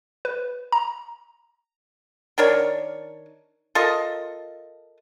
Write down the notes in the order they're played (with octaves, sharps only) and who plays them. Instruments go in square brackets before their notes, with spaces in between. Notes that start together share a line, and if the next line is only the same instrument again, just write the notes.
[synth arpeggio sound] B4
A#5
[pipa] D#3 D4 A#4 C#5
F4 A4 A#4 D#5